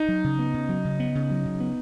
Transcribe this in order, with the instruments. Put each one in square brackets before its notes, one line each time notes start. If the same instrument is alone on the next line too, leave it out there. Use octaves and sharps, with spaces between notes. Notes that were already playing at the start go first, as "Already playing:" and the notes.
Already playing: [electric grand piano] D#4
[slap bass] F#3
C#3
B3
C#3
F#3
C#3
B3
C#3
F#3
C#3
B3